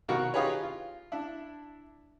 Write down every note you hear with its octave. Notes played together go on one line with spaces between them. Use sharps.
C2 B2 D#3 F#4 A#4 C#6
D#4 F4 G4 G#4 B4 C#5
F4
D4 E4